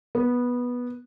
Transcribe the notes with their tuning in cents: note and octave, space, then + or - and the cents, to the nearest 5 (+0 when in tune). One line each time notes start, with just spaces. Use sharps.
B3 -10